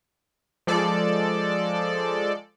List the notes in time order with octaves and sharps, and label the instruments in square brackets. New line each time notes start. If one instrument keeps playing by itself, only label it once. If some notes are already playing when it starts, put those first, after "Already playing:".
[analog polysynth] F3 G#3 A4 D5